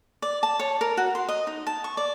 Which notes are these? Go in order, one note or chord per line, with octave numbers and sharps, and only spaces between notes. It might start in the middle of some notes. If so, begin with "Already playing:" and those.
D5
A5
C#5
A#4
F#4
C6
D#5
D#4
A5
C#6
D5